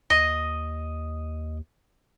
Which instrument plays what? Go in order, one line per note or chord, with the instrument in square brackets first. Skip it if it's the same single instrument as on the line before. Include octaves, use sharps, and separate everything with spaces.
[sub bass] D#2 [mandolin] D#5 [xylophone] A#6 D#7